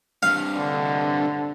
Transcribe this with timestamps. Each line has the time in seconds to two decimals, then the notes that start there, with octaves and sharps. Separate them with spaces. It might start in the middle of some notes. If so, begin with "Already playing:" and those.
0.23 G2 C3 F5
0.57 D3